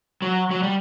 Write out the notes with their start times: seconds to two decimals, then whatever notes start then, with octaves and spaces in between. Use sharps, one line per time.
0.22 F#3
0.51 F#3
0.63 G3